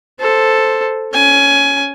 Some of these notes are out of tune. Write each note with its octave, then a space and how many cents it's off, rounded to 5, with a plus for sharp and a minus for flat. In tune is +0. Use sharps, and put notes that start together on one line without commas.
A4 +0 C5 +0
C#4 +10 G#5 +15